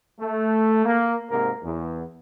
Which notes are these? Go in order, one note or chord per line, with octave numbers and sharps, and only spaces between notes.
A3
A#3
G#2 C3 A#3 A#4
E2